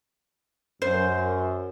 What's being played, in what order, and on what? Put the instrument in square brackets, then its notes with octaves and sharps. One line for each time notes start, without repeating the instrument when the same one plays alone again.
[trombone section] F#2 [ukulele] C5